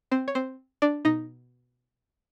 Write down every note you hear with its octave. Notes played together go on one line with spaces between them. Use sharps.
C4 C5
C#5
C4 C5
D4 D5
B2 D#4 D#5